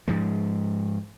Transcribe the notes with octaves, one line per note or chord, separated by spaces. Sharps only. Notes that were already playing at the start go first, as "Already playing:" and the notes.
G#2 F3 G#3